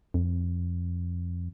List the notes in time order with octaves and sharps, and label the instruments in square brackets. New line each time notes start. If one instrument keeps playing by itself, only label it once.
[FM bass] F2